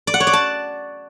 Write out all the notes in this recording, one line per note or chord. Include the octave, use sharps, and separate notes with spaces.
D5
F#5
C#5
D5
A5